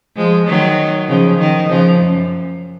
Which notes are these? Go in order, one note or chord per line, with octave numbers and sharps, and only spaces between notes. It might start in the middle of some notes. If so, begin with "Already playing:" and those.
F3 G#3
D#3 F#3
C#3 F3
D#3
C#3 F3
F#2